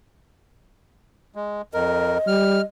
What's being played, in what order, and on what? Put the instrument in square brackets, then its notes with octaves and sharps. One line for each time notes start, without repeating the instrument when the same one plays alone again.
[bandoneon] G#3
[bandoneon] F2 A#4 [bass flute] D#5
[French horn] G3 [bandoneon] F6